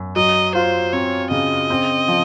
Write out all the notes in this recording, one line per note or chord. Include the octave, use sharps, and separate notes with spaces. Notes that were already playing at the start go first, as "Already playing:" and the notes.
Already playing: F#2
F#3 D#5
F4 C5
C4 C#5
C#3 D#5
C4
F3